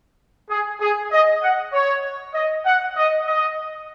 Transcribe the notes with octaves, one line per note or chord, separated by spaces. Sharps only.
G#4
G#4
D#5
F#5
C#5
D#5
F#5
D#5
D#5